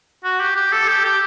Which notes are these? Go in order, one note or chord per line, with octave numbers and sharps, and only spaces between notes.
F#4
G4
G4
A4
G4
G4